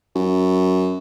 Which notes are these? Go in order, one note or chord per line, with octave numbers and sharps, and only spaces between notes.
F#2